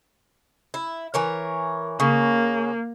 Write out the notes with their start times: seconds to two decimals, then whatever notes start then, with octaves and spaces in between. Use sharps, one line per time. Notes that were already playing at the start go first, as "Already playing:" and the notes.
0.74 E4
1.14 E3 A#4 C#5
2.00 C#3 A#3